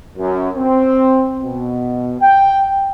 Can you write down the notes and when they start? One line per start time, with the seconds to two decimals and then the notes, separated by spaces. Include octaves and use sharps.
0.18 F#2
0.56 C4
1.40 B2
2.20 G5